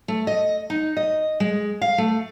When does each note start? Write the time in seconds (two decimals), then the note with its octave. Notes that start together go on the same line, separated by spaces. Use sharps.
0.08 A3
0.27 D#5
0.70 D#4
0.97 D#5
1.40 G#3
1.82 F5
1.98 A3